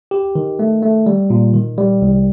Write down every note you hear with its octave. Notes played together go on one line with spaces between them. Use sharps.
G4
D#3
A3
A3
G3
A#2
D#3
G3
C2